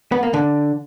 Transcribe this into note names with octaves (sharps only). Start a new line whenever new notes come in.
B3
A#3
D3